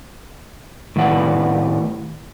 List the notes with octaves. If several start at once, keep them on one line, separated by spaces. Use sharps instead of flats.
A2 D#3 G3 B3 F#5